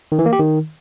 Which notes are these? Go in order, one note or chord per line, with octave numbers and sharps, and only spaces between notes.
D#3
E3
A#3
G4
D#3